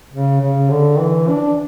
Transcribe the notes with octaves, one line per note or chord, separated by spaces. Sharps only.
C#3
C#3
D3
E3
D4